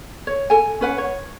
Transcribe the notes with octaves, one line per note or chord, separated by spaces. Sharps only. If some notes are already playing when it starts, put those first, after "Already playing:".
C#5
A4 G#5
C#4 B4 F#5
C#5